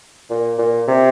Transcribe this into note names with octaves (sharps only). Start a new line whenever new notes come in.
A#2
A#2
C3